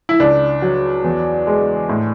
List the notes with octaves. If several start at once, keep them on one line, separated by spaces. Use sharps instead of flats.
E4
C#2 D4
F#3
E2
G#3
A2